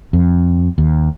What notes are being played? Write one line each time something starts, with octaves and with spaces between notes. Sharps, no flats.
F2
D#2